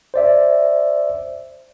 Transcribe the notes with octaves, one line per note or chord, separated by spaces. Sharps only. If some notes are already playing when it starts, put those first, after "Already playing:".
C5 D5 E5